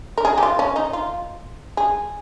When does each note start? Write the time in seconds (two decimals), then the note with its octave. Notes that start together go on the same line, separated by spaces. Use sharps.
0.17 A#4
0.25 G#4
0.37 G4
0.43 F4
0.59 C#4
0.76 D#4
0.93 F4
1.77 G#4